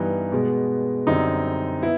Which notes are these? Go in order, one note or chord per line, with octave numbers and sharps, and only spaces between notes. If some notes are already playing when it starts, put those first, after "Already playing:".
Already playing: G2 E3 G3 B3 D#4
B2 G#3 B3
F#2 D3 G3 C4 D#4
B3 E4